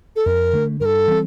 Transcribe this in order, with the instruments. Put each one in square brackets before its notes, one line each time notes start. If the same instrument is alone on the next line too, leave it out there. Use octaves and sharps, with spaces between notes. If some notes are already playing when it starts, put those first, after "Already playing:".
[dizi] A4
[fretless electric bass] F2 [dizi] A#4
[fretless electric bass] D3 A3
[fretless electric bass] G2 [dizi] A#4
[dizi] A4
[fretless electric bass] E3 G3 C4